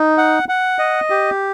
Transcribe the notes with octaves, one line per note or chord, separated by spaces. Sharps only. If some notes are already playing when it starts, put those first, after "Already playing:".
Already playing: D#4
F#5
F#5
D#5
G4